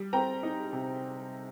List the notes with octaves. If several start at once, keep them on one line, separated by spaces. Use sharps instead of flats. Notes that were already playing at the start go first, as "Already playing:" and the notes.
Already playing: G3
C4 G5 A#5
D#4
C3